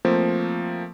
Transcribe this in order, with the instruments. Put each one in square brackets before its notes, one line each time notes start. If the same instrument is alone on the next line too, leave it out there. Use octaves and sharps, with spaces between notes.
[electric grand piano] F3 A3 A#3 C4